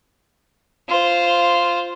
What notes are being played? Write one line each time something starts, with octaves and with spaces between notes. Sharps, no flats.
F4 C5